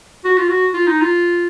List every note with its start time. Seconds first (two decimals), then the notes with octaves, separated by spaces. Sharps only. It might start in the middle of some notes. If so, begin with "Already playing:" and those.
0.24 F#4
0.37 F4
0.49 F#4
0.74 F4
0.87 D#4
1.02 F4